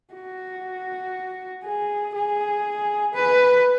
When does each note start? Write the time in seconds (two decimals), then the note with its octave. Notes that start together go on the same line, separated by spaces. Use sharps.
0.14 F#4
1.64 G#4
2.15 G#4
3.14 B4